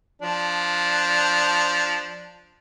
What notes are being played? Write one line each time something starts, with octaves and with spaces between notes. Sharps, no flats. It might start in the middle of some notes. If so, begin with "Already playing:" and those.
F3 D4